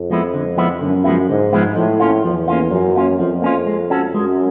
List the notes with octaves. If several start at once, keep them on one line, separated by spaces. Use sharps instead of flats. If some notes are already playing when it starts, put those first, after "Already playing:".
Already playing: F2
F3 G#3 B3 E4
D3
F3 G#3 B3 E4
F#2 D3
F3 G#3 B3 E4
G#2 D3
F3 G#3 B3 E4
A2 F3
A#3 C#4 F4
E2 F3
A#3 C#4 F4
F#2 F3
A#3 C#4 F4
F2 F3
A#3 C#4 F4
G#3
C#4 F#4 A4
F#2 G#3